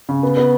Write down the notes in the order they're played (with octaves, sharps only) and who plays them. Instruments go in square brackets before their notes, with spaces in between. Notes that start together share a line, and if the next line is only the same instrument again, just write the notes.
[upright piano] C#3
B3
B3